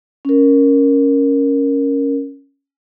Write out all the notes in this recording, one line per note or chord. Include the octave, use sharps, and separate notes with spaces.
C#4 A#4